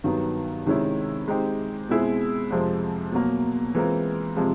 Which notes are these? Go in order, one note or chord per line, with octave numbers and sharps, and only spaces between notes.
G2 D#3 F#3 B3
C3 D#3 G#3 C#4 E4
G#3 C4 D#4 G4
B2 G#3 C4 E4 G#4
F2 C3 F3 G#3 C4
B2 F#3 A#3
E3 G#3 C4 F4 A#4
C3 F3 G#3